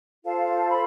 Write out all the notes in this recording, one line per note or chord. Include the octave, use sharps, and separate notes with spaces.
F4 A4 C5 F5 A5
B5